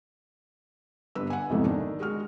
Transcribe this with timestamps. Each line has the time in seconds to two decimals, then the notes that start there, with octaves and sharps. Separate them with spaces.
1.15 G1 G2 B4 E6
1.30 F#5 G#5
1.50 B1 F2 G#2 C3 E3 A3
1.65 D#3 D4
2.00 G#3 F#4 F6